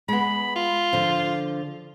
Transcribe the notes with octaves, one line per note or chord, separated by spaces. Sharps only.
G#3 B3 B5
F4
D3 F3